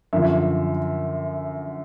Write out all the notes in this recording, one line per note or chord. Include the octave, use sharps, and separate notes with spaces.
F#2 D3 F3 E5